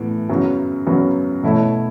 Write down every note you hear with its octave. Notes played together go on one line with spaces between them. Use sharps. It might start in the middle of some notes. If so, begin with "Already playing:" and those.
Already playing: A2 E3 B3
F#2 C#3 F#3 B3
F#2 C#3 F#3 B3
B2 A3 E4 A4 C#5